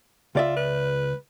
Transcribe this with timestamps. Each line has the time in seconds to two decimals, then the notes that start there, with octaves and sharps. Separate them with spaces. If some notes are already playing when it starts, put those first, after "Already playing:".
0.35 C#2 F4 D5 E5
0.57 B4